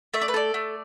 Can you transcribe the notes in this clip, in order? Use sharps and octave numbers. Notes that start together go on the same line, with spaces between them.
A3 E5
D5
B4
A4 D5
A3